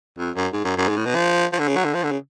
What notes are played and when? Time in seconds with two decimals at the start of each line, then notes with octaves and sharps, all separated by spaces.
0.18 F2
0.36 F#2
0.53 G#2
0.65 F#2
0.77 F#2
0.89 G#2
0.97 A2
1.06 B2
1.15 F3
1.52 F3
1.59 D3
1.68 C#3
1.76 F#3
1.85 D3
1.94 F3
2.03 D3
2.11 C#3